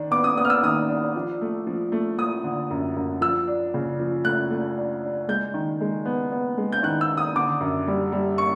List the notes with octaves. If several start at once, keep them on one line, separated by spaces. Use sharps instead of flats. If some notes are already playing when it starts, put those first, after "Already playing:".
Already playing: D#3 D4
B3 D6
D#6
B3 D#6
F6
E6
D#3 D#6
D4
F3
A3
F3
A3
A3 D#6
D3
F#2
F#2
F3 E6
D4
C#3
F3
A3 F#6
A3
D4
D4
G#3 G6
D#3
G#3
B3
B3
G#3
G6
D#3 F#6
E6
D#3
D#6
D3 D6
F#2
G3
G3
C#6